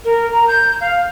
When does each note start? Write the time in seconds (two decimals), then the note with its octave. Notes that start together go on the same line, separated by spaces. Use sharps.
0.04 A#4
0.32 A#5
0.48 G6
0.81 F5